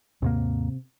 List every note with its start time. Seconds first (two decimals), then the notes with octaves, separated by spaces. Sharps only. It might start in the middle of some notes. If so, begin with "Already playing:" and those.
0.22 D#2 G#2 C3 A#3